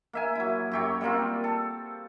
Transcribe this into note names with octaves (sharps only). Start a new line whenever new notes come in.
A#3 E5 G#5
F#3 E4
F#2 G4 C#5
G3 A#3 C4 F4
A4